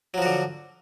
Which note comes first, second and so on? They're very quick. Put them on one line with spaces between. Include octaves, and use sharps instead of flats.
F#3 F3 F#4 D3